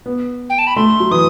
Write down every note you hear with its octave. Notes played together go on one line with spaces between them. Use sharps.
B3
G5
A5
B5
A3 C6
F#3
E3 D#6